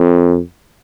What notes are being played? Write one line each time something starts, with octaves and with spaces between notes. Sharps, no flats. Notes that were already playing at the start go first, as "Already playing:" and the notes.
Already playing: F2